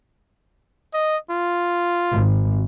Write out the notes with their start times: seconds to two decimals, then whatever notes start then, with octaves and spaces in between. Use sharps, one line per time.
0.94 D#5
1.31 F4
2.12 G#1